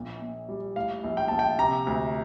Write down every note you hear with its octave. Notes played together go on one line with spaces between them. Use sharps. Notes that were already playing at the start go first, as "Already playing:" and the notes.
Already playing: A#1 A#2
A#2
G3
A2 F5
A#1
G5
A#1 A5
G5
C3 A#5
D2